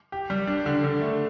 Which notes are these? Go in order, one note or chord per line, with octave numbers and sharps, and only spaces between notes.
G4
G3
D4
D3
D3
A3